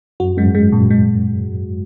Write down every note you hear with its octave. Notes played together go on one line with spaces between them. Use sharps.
F#2 F#4
F#2 G#3
G#2
G#3
F#2 A#2
G#3